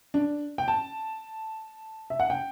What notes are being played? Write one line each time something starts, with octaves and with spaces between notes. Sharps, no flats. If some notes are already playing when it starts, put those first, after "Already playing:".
D4
G5
A5
E5
F#5
G5